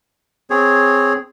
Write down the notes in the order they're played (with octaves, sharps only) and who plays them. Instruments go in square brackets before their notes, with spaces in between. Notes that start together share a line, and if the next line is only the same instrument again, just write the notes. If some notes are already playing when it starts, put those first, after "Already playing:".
[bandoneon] C4 G#4 C#5